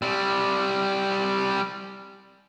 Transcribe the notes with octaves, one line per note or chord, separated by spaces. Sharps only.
G3 C4